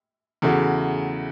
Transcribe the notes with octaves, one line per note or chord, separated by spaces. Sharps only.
E2 C#3 A3 F#4